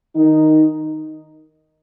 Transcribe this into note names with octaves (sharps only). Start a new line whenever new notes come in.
D#3 D#4